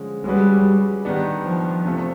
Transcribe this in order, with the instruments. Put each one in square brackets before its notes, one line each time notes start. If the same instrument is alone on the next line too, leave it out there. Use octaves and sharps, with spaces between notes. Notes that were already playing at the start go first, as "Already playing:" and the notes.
Already playing: [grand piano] D3 F3 G#3 C#4
[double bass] G3 [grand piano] G#3 C#4 F#4 B4
[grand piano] D#3 G3 B3 D4
[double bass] F3
[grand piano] E2 C3 F3 A3